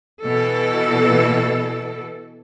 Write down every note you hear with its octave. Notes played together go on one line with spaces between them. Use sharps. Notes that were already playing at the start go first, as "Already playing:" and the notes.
B2 E3 A4